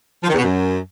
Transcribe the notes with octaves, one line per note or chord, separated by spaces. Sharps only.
F3
D#3
E2
B2
F#2